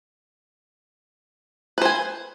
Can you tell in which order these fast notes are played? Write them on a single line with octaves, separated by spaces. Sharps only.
B4 C5 G#5